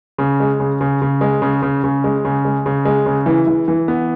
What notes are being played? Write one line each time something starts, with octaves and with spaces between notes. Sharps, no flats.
C#3
G#3
C#3
C#3
C#3
G#3
C#3
C#3
C#3
G#3
C#3
G#3
C#3
G#3
C#3
E3
E3
E3
B3